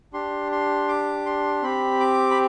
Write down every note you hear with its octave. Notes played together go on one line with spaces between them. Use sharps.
D4 G4 C6
C6
D6
C6
C4 G4 B5
D6
B5